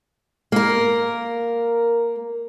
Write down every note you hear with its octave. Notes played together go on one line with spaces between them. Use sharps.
A#3 A#4